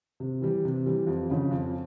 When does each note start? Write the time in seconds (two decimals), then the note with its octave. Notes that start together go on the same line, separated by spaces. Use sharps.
0.20 C3
0.42 E3 G3
0.65 C3
0.86 E3 G3
1.07 F2
1.29 C#3 F3
1.51 F2